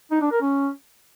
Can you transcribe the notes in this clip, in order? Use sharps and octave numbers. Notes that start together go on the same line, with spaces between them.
D#4
D4
A#4
C#4